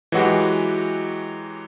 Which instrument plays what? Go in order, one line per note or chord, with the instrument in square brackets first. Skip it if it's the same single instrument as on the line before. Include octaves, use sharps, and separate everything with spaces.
[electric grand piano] E3 F#3 G#3 F#4 G4